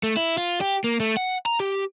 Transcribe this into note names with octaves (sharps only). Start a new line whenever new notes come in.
A3
E4
F4
G4
A#3
A3
F#5
A#5
G4